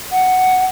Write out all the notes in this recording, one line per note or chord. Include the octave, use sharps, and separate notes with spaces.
F#5